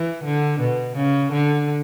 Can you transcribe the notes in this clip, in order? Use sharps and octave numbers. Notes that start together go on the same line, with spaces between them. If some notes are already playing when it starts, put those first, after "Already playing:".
Already playing: E3
D3
B2
C#3
D3